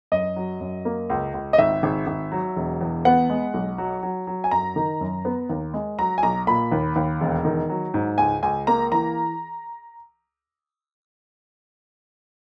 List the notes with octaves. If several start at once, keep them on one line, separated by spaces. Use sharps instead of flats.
F#2 D#5
F#3
F#2
A#3
C#2
C#2
D#5
G#1 E5
G#1
G#1
F#3
E1
E2
B3 F#5
G#3
B1
F#3
F#3
F#3
G#5
F#2 A#5
D#3
F#2
B3
D#2
G#3
F#3 A#5
G#5
B1 A#5
A#2 B5
D#2
D#2
E1
D#3
F#3
G#2
C#2 G#5
C#2 G#5
A#3 A#5
E3 A#5